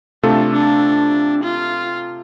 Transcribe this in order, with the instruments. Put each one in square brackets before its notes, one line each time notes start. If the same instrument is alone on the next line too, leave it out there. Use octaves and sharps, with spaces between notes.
[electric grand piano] C3 A3 F4 A4 [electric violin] D4
[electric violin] D4
F4